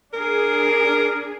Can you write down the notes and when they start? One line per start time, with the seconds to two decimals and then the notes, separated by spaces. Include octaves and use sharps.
0.13 D4 G#4 A#4